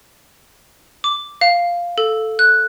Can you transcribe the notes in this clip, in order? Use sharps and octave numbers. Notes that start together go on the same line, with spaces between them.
D6
F5
A4
F#6